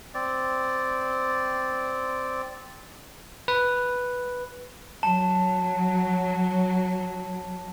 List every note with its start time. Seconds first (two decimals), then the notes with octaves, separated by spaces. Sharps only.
0.14 C4 D5
3.48 B4
5.03 F#3 A5